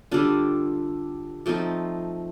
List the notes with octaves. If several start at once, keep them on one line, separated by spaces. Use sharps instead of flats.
D3 G3 D4 F4
F3 A3 C4 D#4